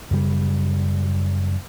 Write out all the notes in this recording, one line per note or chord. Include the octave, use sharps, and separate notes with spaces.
F#2 C#3 G3